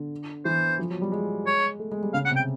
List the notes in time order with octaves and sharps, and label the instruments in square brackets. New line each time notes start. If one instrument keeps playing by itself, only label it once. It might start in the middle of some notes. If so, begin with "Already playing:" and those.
Already playing: [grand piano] D3
[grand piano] E3 [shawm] C5
[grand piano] F3
F#3
G3
G#3
[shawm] C#5
[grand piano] A3
G#3
G3
[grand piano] C#3 [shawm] F5
[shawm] F#5
[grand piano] C3
[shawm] G5